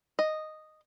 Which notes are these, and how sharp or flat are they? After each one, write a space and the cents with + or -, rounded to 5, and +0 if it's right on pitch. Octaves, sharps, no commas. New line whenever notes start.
D#5 -5